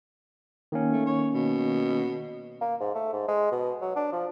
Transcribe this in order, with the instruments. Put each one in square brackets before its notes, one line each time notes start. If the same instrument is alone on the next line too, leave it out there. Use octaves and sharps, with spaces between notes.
[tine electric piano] D#3 A#3 C#4
[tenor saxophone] A3
C#5
B2
[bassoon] A#3
G#2
A3
G#2
G#3
B2
F#3
D4
F3